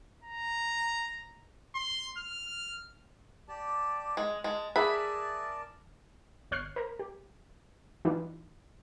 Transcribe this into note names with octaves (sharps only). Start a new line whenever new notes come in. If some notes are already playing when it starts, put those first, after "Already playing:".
A#5
C6
F6
G4 D5 A5
G#3
G#3 A5
G#4 A#4 D5 E5 A5 B5 F#6
G1 C#5 F6 F#6 C7
A#4 C5 A#5
G4
E3 G3 D4 D#4 F4 B4